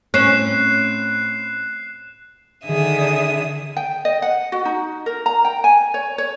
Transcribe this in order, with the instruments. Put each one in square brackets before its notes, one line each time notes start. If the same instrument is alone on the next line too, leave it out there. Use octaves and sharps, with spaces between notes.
[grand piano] A2 C4 [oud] C#4 [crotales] F#6 C7 E7
[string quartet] D3 D#3 G#4 E5 D#6
[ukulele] G5
D#5
F#5
F#4
D#4
A#4
A#5
G5
G#5
C#5
C#5